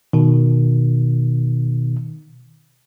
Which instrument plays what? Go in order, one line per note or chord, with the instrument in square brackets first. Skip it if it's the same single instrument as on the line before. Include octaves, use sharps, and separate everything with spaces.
[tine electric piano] B2 D#3